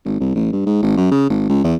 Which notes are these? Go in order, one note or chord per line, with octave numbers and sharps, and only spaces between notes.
G#1
C2
A1
G2
G#2
G#1
F#2
C#3
G#1
C#2
E2